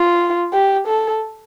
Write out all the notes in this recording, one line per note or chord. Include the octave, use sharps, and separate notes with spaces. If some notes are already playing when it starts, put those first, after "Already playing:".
Already playing: F4
G4
A4